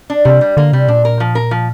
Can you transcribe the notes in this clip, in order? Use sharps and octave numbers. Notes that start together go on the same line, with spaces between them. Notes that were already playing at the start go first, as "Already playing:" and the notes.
D4
C3 G3
G3
D3 A#3
C3 G3
A#2 D4
A#4
F3
A#4
F3